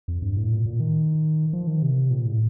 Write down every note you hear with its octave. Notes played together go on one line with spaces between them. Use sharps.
F2
G2
A2
A#2
A#2
D#3
F3
D#3
C3
A#2
A2